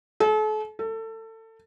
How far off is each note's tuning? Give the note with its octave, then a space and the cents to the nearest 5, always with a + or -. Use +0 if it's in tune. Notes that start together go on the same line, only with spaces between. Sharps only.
A4 -40
A4 +25